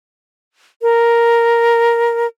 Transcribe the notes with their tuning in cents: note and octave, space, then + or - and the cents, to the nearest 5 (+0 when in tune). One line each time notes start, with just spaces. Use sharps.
A#4 +5